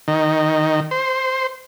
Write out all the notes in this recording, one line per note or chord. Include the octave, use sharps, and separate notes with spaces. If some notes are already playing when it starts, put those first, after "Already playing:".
D#3
C5